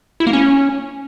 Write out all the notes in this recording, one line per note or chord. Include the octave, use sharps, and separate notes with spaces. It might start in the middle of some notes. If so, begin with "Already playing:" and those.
E4
A#3
C#4